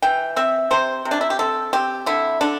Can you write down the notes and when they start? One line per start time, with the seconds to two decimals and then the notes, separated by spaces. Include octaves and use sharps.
0.02 E3 G5
0.36 C4 E5
0.71 C3 C5
1.05 C3
1.11 D4
1.21 E4
1.30 G4
1.39 C4 A4
1.73 C4 G4
2.06 D3 E4
2.41 D3 D4